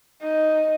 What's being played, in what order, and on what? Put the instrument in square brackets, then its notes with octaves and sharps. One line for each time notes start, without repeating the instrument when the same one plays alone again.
[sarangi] D#4